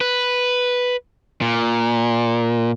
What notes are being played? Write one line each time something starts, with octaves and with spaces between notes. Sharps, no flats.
B4
A#2